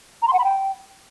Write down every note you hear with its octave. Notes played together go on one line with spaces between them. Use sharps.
A#5
C6
F#5
B5
G5